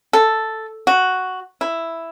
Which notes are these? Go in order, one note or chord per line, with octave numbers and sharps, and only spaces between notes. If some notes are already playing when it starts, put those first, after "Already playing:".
A4
F#4
E4